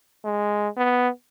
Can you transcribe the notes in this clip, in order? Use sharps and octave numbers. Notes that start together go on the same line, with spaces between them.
G#3
B3